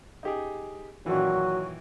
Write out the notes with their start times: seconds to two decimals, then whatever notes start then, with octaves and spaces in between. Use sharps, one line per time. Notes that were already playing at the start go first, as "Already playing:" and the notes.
0.23 D#4 G4 G#4
1.06 A#2 D#3 E3 F#3 F#4